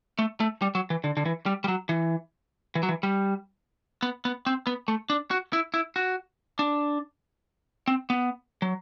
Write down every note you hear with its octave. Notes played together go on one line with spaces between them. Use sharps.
A3
A3
G3
F#3
E3
D3
D3
E3
G3
G3
F#3
E3
E3
F#3
E3
G3
B3
B3
C4
B3
A3
D4
F#4
E4
E4
F#4
D4
C4
B3
F#3